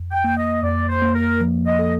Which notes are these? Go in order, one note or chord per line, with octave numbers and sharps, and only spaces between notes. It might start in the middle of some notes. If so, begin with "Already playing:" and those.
Already playing: F2
G5
A#3
D#5
F2 D5
C5
A#3
A#4
F3
D#5
A4